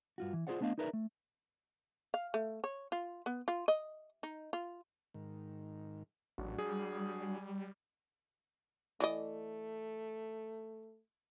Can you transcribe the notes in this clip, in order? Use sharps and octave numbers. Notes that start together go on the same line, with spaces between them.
G2 F4 F#4
E3
F4 G4 G#4 C5 D5 F#5
A3 B3 D4 D#5 F5
D#4 G#4 A#4 B4 D5 E5
A3
F5
A3
C#5
F4
B3
F4
D#5
D#4
F4
G#2 D#3
A1 F#3 D4 F#4
G3 G#4
E3 A3 D5 D#5